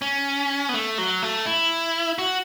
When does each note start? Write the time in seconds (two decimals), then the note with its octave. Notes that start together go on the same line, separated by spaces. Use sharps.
0.02 C#4
0.69 B3
0.74 A3
0.98 F#3
1.22 A3
1.46 E4
2.18 F#4